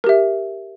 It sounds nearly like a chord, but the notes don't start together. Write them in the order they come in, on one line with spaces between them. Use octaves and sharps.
A#4 G4 E5